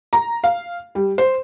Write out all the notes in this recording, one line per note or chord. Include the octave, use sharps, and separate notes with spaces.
A#5
F5
G3
C5